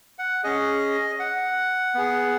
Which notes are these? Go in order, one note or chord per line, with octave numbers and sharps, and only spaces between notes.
F#5
C#4 G#4 D#5
F#5
B3 G#4